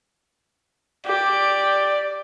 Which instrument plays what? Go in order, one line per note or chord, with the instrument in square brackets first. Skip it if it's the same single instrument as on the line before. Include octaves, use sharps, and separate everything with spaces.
[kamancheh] G4 [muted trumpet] D5